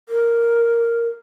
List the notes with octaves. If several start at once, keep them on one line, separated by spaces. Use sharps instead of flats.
A#4